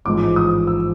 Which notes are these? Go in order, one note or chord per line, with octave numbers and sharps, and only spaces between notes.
A1 G#2 F3 G#3 D6
D#6
E6